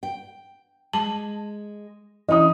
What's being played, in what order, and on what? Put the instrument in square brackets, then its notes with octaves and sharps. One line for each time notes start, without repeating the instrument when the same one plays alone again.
[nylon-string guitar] G5
[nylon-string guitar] G#3 [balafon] A5
[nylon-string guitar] D3 C#4 [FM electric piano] E3 E4 [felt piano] D#5 D#6